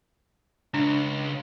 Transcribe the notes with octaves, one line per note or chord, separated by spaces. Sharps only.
C#2 D4